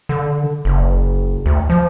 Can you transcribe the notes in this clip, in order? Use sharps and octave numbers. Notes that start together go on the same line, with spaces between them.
D3
F#1
D2
F3